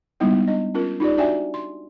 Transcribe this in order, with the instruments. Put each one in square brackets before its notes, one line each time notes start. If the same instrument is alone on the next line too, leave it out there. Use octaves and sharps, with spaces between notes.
[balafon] G3 G#3 A#3 B3 D#4 E4
D4 D#5
C#4 F4 A#4
D#4 F4 G4 D5
D4 F#4 D5 E5 G5 G#5
C6